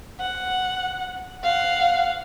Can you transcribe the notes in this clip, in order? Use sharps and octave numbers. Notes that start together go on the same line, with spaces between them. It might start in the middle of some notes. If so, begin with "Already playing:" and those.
F#5
F5 F#5